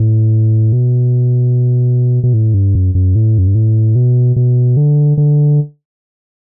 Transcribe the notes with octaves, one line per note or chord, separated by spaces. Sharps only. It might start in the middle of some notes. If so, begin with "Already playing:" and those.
Already playing: A2
B2
B2
A2
G2
F#2
F#2
A2
F#2
G2
A2
B2
B2
D3
D3